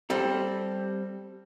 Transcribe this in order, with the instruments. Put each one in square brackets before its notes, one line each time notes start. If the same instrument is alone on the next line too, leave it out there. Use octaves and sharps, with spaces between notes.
[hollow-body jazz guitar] G3 C4 A4